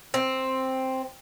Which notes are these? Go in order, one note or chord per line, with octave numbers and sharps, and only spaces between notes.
C4